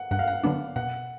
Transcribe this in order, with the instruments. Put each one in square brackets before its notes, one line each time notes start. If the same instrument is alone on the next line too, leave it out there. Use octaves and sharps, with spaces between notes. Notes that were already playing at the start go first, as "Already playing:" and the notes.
Already playing: [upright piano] F#5
[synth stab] G2 [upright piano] F#5
[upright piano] F5
F#5
[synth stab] D3 F#3 B3 D4
[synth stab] B2 [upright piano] F#5